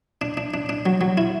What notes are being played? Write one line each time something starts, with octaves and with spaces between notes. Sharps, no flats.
D4
D4
D4
D4
F#3
F#3
E4